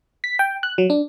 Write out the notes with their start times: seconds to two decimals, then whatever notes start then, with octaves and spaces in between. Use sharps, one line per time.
0.24 B6
0.39 G5
0.63 F#6
0.78 F#3
0.90 D4